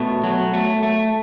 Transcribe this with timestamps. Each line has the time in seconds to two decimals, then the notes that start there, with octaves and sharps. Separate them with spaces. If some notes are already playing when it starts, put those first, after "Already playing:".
Already playing: B2 A3
0.24 F#3
0.54 A3
0.83 A3